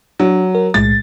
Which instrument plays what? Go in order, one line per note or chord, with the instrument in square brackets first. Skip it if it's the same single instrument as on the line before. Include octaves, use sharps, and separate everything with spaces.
[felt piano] F#3 [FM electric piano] D4
[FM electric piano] A#4
[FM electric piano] B1 A2 G#3 [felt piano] A6